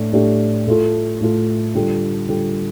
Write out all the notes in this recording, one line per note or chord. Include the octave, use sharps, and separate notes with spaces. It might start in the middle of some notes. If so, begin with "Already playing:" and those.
Already playing: A2 A3 D4
A2 A3 D4 G4
A2 A3 F4 A4
A2 A3 F4 A4
D3 G3 F4 A4
D3 G3 F4 A4